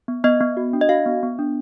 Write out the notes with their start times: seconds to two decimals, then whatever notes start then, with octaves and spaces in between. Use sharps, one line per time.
0.08 B3
0.24 B3 D#5
0.40 B3
0.57 F#4
0.73 D4
0.81 D#5
0.89 F#4 F5
1.06 B3
1.23 B3
1.39 D4